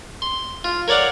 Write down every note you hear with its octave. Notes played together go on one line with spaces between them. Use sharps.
C6
F4
A#4 C#5 D5 F5 F#5